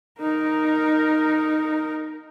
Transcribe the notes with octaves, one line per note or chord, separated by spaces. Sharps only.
D#4 A#4